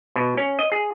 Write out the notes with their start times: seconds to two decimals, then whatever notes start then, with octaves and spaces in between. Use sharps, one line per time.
0.16 B2
0.37 C#4
0.59 D#5
0.72 G#4